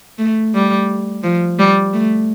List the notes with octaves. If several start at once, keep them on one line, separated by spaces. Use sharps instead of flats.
A3
G3
F3
G3
A3